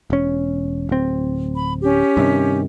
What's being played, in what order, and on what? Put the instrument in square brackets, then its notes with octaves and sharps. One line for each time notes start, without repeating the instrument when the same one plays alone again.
[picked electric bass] E1 C#4
D1 C4
[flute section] B5
C#4 G4
[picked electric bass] G2 C3 D#3